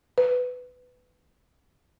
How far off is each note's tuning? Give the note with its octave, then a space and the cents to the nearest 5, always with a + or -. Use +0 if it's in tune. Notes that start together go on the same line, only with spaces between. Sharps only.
B4 +15